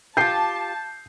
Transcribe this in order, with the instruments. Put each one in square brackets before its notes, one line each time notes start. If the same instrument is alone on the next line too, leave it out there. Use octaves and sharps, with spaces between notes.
[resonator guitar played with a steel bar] F4 G4 [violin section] A5 [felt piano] G6 C7